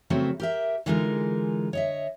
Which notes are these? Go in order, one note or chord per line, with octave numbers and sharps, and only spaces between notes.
C#3 F3 F#3 A3 B3 C4
G4 A#4 E5
D3 E3 G#3 D#4 F4 A#4
C#5 D#5 E5